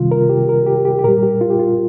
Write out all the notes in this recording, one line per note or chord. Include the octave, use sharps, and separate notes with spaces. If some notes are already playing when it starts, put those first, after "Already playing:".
Already playing: C3 D#3 G3 F4
A#4
G4
A#4
G4
G4
G4
A#2 G3 A#4
G4
F4
G4
F4